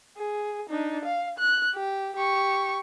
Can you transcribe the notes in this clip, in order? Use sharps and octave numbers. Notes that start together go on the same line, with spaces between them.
G#4
D4 D#4
F5
F#6
G4
G4 C#6